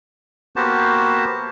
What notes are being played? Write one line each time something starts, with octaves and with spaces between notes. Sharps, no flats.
A#3 B3 F#4 G4 C5 A5